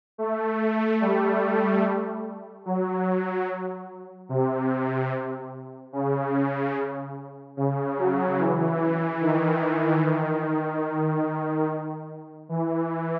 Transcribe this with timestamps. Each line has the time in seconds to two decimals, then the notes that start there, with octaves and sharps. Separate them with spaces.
0.18 A3
1.01 G3
2.66 F#3
4.29 C3
5.93 C#3
7.57 C#3
7.98 F#3
8.39 E3
8.81 E3
9.21 D#3
12.49 E3